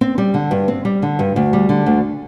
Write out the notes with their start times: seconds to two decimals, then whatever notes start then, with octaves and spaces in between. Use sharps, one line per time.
0.01 C4
0.18 G3
0.34 D3
0.51 G2
0.68 C4
0.85 G3
1.02 D3
1.19 G2
1.36 D2
1.53 G3
1.69 D3
1.86 D2